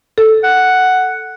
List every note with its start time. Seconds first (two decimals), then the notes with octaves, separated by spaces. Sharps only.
0.18 A4
0.44 F#5